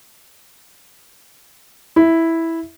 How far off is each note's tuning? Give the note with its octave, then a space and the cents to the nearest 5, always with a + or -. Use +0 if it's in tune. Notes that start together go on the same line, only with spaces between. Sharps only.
E4 -5